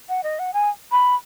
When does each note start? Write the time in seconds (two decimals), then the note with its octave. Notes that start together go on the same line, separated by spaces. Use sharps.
0.09 F#5
0.24 D#5
0.39 F#5
0.54 G#5
0.92 B5